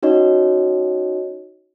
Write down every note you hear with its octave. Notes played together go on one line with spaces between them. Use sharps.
C#4 D#4 F#4 C#5 D#5